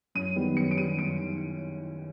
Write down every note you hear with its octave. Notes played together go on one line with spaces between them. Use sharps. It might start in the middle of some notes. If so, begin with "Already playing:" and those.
F#2 D#7
D#3 G3 B3
F#2 C#7
D7
D#3 G3 B3 D#7
F#2 D7
D#3